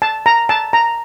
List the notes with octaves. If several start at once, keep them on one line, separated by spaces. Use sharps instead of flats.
A5
A#5
A5
A#5